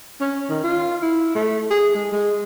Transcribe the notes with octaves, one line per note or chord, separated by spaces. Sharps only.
C#4
D#3
F4
E4
A3
G#4
G#3
G#3